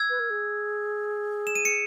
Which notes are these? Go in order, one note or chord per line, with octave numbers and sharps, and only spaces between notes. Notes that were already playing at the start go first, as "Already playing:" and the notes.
Already playing: E6 G#6
B4
A#4
G#4
E7
D#7
C#7